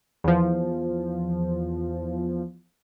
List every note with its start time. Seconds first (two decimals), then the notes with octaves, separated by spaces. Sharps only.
0.24 E2 F3